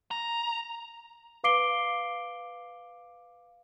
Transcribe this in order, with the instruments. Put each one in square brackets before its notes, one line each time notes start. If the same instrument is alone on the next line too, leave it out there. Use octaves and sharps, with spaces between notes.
[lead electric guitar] A#5
[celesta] B4 F5 D6 C7 D7 G7